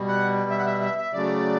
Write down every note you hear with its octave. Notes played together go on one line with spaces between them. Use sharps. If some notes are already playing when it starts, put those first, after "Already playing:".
Already playing: B2 G3
F#5
E5
F#5
E5
E5
E5
C#3 F#3 A3 D5